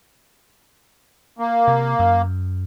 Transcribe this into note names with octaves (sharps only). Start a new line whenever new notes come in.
A#3
C3
F#2